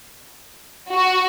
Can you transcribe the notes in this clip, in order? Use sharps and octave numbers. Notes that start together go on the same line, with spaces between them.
F#4